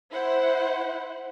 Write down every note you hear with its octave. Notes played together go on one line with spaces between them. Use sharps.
E4 C5 F#5